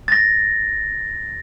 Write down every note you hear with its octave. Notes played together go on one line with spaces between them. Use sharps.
A6 A#6